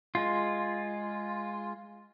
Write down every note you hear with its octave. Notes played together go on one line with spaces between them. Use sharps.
G#3 F4